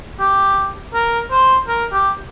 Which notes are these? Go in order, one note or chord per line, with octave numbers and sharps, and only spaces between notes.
G4
A#4
C5
A#4
G4